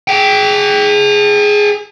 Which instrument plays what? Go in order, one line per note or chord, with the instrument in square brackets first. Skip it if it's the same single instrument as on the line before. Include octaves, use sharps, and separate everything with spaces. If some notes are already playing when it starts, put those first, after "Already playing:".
[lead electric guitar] G#4 G5